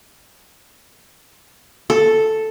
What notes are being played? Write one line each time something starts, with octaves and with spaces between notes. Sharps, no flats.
A4